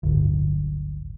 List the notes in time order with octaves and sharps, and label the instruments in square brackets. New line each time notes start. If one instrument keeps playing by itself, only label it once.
[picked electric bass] D1 G1